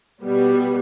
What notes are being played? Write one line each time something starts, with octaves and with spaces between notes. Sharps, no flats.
B2 G3 B3